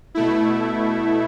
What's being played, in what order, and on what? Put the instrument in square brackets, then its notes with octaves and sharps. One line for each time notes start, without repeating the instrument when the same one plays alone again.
[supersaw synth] B2 A3 E4